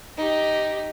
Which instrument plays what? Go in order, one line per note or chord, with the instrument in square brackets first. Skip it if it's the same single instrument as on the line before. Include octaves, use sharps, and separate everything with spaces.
[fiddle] D#4 G4